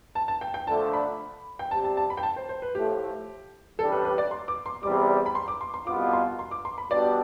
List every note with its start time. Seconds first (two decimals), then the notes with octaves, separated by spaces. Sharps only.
0.15 A5
0.28 A5
0.41 G5
0.54 G5
0.67 D3 F3 A3 D4 A5
0.93 B5
1.59 G5
1.71 C3 G3 C4 G4 A5
1.84 A5
1.97 A5
2.10 B5
2.17 G5
2.23 A5
2.36 C5
2.49 C5
2.62 B4
2.75 A2 F3 A3 G4
3.79 A1 A2 G3 D4 G4 A4
3.92 B4
4.05 B4
4.18 D5
4.31 C6
4.48 D6
4.66 C6
4.83 E2 C3 G3 D6
5.26 B5
5.35 C6
5.48 D6
5.61 C6
5.74 C6
5.86 C2 B2 B3 F4 D6
6.13 C6
6.39 C6
6.51 D6
6.65 C6
6.78 B5
6.91 B2 G3 D4 G4 D5